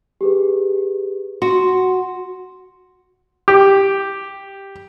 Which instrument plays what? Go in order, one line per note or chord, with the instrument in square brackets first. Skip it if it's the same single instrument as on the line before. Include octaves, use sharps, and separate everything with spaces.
[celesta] G4 G#4 B4
[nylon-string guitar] F#4 [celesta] C6
[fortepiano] G4